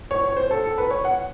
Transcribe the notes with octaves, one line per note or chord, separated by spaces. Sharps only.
C#5
C#5
C5
A4
A4
B4
C#5
F#5